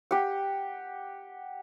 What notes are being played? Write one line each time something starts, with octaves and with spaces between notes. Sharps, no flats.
G4 F#5